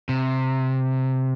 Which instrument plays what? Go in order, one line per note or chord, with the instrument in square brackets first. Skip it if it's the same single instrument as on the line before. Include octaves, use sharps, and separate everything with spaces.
[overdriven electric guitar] C3